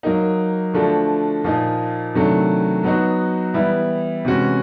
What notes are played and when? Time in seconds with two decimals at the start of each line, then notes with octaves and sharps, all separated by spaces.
0.03 F#3 A#3 D#4
0.74 D3 F3 A3 D4 F#4
1.44 A#2 F3 A#3 D#4
2.14 C3 D#3 F#3 A3 D4
2.83 F#3 B3 D#4 F#4
3.54 E3 G3 B3 E4
4.25 C3 E3 G#3 C#4 F#4